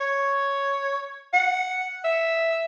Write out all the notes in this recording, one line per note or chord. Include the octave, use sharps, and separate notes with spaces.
C#5
F#5
E5